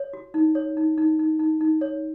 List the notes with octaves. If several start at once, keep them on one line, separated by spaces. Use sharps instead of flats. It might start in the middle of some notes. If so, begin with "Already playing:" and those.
Already playing: C#5
F#4
D#4
C#5
D#4
D#4
D#4
D#4
D#4
C#5